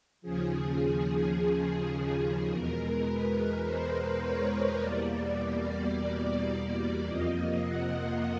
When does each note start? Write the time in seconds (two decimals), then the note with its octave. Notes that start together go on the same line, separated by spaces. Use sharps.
0.22 D#2 C#3 F3 G#4
2.50 E2 B2 G#3 A#4
3.07 B4
3.65 C5
4.22 C#5
4.79 E2 B2 G3 A#3 D5
6.50 D5
7.07 F2 C3 F3 A#3 D#5
7.65 F#5